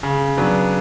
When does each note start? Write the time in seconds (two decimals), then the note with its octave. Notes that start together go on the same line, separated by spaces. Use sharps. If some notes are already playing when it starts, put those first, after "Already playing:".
0.03 C#3
0.37 F#3 B3 D4